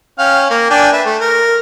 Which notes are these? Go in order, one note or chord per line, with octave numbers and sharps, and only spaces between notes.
C#4 F5 G5
A#3
D4 G5 G#5
B4 E5
A3
A#4